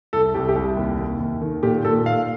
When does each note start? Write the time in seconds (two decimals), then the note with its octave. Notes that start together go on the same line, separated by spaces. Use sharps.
0.13 C2 A4
0.34 C2 G4
0.48 G4
0.56 C2
0.77 D#2
0.99 D#2
1.20 D#2
1.41 D#3
1.63 A#2 G4
1.85 A#2 A4
2.06 A#2 F5